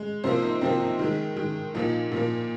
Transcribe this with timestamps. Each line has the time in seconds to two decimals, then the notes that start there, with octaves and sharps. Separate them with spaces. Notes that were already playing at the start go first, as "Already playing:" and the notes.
Already playing: G#3
0.24 C3 F3 A#3 C5
0.42 D#4
0.61 C3 F3 A#3 C4
0.80 D#4
0.99 D#3 G#3
1.37 D#3 G#3
1.74 A#2 F3 A#3 D#4
2.12 A#2 F3 A#3